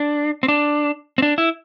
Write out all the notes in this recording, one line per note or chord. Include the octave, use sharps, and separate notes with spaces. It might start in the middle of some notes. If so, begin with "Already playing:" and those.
Already playing: D4
C4
D4
C4
D4
E4